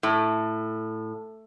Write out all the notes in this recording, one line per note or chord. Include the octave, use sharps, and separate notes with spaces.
A2